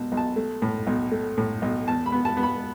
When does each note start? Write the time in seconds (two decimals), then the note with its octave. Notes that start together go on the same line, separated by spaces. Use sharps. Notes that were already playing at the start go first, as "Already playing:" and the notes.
Already playing: B1 B2 A5
0.12 B1
0.17 A5
0.36 A3
0.62 A2
0.87 B1
1.12 A3
1.38 A2
1.62 B1
1.87 E2 A5
2.06 B5
2.12 B3
2.25 A5
2.37 B3
2.43 B5